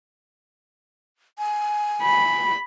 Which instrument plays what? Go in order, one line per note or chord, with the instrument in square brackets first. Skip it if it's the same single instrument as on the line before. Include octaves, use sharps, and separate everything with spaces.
[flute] G#5
[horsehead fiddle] B5